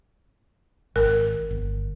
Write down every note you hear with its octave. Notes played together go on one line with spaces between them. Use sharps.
G#1 A#4
G1